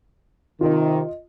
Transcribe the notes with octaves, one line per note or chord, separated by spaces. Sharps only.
C3 D#3 F4 D#5